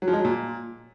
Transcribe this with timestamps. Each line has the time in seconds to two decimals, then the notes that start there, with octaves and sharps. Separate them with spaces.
0.02 F#3
0.08 F3
0.13 G#3
0.19 F#3
0.25 A#2